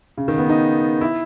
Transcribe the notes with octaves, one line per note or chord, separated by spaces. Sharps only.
C#3
D#3
B3
D#4
E4